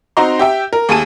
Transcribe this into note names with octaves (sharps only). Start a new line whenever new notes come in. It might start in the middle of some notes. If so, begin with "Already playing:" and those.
C4 D#4 F#4 A#5 C6
G4 E5 G5
A#4
D#2 A3 G#4 A4 A5 D#7